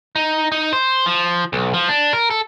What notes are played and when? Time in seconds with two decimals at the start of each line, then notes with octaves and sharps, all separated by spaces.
0.16 D#4
0.52 D#4
0.73 C5
1.06 F3
1.53 B1
1.74 F3
1.89 D4
2.13 A#4
2.30 A4